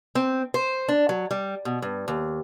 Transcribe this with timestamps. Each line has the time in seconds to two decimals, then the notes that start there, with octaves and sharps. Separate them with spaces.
0.15 C4
0.54 C5
0.89 D4
1.09 F#3
1.31 G3
1.65 B2
1.82 G2
2.08 D#2